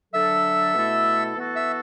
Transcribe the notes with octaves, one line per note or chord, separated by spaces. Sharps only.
D3 F#3 D4 A4 E5
B2 A3 E4 A4
E3 B3 F#4 A4
E5